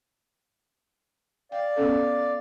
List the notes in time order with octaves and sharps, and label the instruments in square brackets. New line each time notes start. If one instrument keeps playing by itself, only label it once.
[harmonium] D5 F5 [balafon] G5
[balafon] B3 C#4 A4